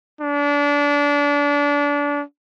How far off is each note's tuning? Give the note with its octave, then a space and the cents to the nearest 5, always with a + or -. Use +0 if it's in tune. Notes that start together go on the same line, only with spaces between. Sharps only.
D4 -30